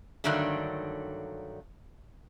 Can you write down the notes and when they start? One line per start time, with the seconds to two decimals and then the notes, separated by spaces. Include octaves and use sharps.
0.24 G2 D3 D#3 F#3 A3 D4